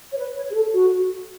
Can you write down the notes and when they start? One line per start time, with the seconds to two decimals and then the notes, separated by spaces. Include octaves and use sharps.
0.12 C#5
0.17 B4
0.36 C#5
0.50 G#4
0.55 A4
0.74 F#4